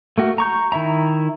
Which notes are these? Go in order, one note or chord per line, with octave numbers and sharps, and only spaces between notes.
A3 A#3 F#4
A#5 C#6 G6
D#3 E4 E5 A#5